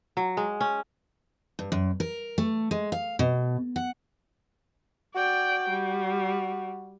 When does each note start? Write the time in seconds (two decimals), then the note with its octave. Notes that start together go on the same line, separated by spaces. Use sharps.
0.17 F#3
0.37 G#3
0.61 C#4
1.59 G2
1.72 F#2
2.00 A#4
2.38 A3
2.71 G#3
2.92 F5
3.19 B2
3.76 F#5
5.15 F#4 D5 G5
5.69 G3